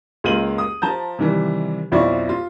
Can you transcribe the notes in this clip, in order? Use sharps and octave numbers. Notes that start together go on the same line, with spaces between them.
C#2 A#3 F4 D#7 F#7
D#6
F3 A5 A#5 G6
C3 D#3 E3 G3
B1 F2 E4 F4 D5 C#6
F4